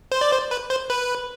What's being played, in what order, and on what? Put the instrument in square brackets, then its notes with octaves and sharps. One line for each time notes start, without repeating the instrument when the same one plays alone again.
[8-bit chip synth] C5
D5
C5
B4
C5
B4